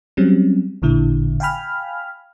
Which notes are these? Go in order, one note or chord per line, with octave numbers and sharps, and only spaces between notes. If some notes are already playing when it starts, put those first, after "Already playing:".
F#3 G3 C4 C#4
A1 A#2 D3 E4
F5 G5 G#5 B5 F6